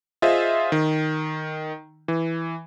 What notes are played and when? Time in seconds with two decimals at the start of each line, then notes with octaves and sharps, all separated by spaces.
0.22 F4 G#4 C5 D#5 E5
0.72 D#3
2.08 E3